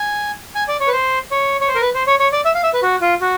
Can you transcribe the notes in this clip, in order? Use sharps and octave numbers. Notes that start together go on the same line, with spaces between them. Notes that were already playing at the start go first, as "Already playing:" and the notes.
Already playing: G#5
G#5
D5
C#5
B4
C5
C#5
C#5
C5
A#4
B4
C5
C#5
C#5
D5
E5
F5
E5
B4
F#4
F4
F#4